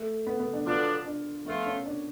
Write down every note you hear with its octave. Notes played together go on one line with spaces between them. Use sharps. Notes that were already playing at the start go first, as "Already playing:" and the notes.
Already playing: A3
B3
B3
D4
D3 F#3 B3 D4 F4
D4
F3 A3 B3 F4
C#4
D4